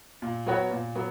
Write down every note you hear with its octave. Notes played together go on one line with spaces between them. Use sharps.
A#2
F#3 B3 F#4 C#5
A#2
F#3 B3